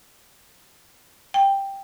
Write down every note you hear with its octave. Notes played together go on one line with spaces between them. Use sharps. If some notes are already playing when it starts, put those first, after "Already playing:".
G5